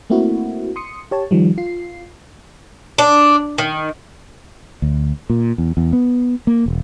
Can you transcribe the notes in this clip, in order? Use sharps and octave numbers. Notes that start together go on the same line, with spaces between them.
A3 A#3 C4 E4 F#4
C6 D#6 C#7
G4 C#5 A5
D#3 F3 G3
F4 C7
D4
D#3
D2
A#2
E2
E2
B3
A#3
E1